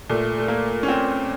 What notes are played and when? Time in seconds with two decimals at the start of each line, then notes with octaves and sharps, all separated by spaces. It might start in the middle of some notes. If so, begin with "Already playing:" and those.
0.10 A#2 A3
0.38 A3
0.48 A#3
0.83 C#4
0.88 C4